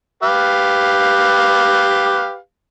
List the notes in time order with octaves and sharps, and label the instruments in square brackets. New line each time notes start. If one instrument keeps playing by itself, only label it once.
[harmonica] G4 B4 F5